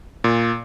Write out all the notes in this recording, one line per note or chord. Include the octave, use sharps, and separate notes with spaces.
A#2